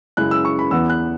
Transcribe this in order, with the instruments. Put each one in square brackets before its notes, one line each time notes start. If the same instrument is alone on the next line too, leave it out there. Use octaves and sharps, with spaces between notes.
[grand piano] F#2 C#3 G#3 E4 F#6
E6
C#6
B5
E2 E3 B3 E6
F#6